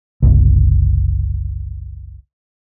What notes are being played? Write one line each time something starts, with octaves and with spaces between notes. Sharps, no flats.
F#1 C2